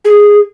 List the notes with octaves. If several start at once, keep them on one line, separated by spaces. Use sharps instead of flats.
G#4